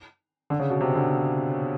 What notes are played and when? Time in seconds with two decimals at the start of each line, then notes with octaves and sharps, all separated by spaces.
0.50 D3
0.59 C#3
0.70 B2
0.81 C3
0.95 D3